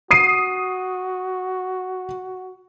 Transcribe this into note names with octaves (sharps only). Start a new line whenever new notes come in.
F#4 D#6 C7 D#7